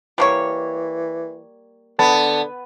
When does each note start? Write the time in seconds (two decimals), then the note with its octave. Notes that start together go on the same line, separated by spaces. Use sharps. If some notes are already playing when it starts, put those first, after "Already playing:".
0.18 E3 G3 A#3 C#5
1.99 D3 B3 A5